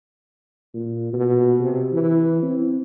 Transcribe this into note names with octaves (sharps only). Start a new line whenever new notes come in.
A#2
B2
C3
E3
C4